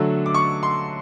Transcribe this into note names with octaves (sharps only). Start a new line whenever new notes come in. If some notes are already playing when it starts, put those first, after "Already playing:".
Already playing: D3 F#3 A3
D6
C#6
C6